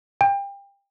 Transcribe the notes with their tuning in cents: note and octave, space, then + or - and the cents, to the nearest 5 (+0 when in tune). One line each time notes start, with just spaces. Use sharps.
G5 +30